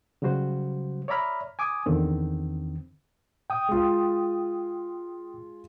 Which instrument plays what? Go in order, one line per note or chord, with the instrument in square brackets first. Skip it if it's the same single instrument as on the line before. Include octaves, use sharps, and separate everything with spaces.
[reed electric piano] C#3 F#3 G3 F#4 C5
C#5 D5 E5 A#5 B5 F6
G#5 D6 D#6
E2 D3 D#3 C4
G5 D#6
[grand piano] G#3 F4